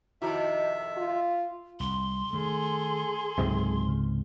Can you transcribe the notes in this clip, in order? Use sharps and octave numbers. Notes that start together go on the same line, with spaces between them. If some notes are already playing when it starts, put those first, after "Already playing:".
F2 C3 D#3 E4 F#4 E5 A#5
F4
C2 C6
D#3 A3 G#4 A4
C#2 G#2 C3 F#3
C#3